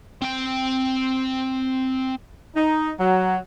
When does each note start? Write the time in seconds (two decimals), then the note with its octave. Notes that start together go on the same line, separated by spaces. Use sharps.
0.22 C4 G5
2.55 D#4
2.98 F#3